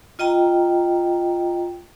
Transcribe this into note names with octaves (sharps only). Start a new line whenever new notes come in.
F4 D#5 G5 A#5